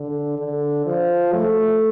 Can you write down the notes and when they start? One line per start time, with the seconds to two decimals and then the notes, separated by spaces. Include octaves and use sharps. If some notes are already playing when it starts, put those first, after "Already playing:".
Already playing: D3
0.39 D3
0.86 F3
1.34 A3